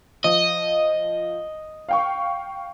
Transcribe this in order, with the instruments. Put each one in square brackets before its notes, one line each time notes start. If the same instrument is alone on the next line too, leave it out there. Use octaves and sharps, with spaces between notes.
[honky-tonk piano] F3 [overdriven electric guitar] D#5
[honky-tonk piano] F5 G5 C#6